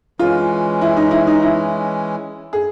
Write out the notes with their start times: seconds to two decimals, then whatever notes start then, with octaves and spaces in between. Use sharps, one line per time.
0.19 E3 G#3 C#4 F4
0.81 E4
0.97 D#4
1.11 E4
1.27 D#4
1.42 E4
2.53 G#4